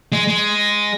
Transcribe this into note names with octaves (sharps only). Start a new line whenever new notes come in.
G#3
G#3